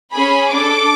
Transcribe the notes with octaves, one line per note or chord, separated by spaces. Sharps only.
C#4 G#4 B5
D4 A4 D6